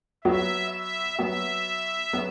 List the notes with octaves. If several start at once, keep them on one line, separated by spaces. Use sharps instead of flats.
F#3 B3 F#4 E5
E5
F#3 B3 F#4 E5
F#3 B3 F#4